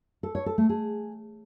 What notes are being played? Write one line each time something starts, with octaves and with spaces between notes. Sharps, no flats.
A4
C#5
A4
A3
G#4